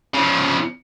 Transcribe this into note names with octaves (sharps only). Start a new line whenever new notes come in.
C#3 F3